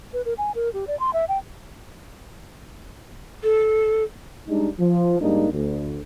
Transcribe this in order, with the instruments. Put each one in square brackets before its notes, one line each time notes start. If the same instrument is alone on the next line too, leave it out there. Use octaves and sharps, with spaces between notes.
[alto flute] B4
A#4
G#5
A#4
G4
D5
C6
E5
G5
[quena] A4
[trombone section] G3 G#3 D4 D#4
F3
G#2 G3 A#3 D4 D#4
D2